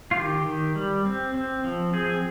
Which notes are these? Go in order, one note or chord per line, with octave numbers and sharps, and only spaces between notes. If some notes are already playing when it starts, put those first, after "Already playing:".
F4
D#3 G4
D#3
G3
C4
C4
F3
C4 G#4